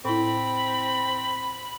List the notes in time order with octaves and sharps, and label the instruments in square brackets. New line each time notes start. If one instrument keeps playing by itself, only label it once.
[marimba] A2 E4 [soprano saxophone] C4 [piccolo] B5